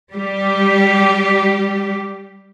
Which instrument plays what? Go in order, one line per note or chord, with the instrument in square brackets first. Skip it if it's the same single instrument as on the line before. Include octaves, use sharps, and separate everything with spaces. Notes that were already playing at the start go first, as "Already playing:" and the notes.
[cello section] G3 G4